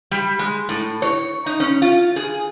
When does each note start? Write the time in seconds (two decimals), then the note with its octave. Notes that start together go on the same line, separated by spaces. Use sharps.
0.11 G3
0.39 G#3
0.69 A2
1.02 C#5
1.46 D#4
1.60 C#4
1.82 F4
2.16 G#4